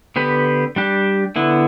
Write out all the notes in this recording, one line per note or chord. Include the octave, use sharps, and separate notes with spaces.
D3 B3 G4 B4
G3 D4 G4
D3 B3 E4